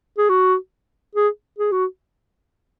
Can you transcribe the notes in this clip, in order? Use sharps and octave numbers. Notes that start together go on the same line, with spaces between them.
G#4
F#4
G#4
G#4
F#4